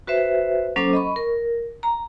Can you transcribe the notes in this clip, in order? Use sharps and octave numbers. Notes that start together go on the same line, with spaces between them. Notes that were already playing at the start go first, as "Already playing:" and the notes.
F#4 B4 C5 E5
F#3 A#3 C#4 A4 C5 D6
D#5 B5 C#6
A#4
A#5